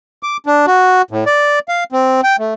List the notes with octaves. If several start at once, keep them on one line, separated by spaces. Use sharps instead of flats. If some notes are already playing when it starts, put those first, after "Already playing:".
D6
D4
F#4
A2
D5
F5
C4
G5
A3